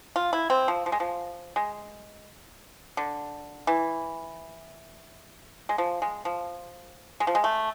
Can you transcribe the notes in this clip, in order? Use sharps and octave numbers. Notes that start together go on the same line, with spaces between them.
F4
E4
C4
F3
F3
G#3
F3
G#3
D3
E3
G#3
F3
G#3
F3
G#3
F3
G#3
A3